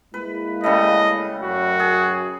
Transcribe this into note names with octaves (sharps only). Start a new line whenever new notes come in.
G#3 A#3 E4 B4
C#3 G3 A3 D#5
F#2 F#4
G#4